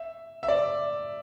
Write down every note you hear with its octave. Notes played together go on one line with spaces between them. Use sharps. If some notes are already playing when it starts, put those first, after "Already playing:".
Already playing: E5
E5
D5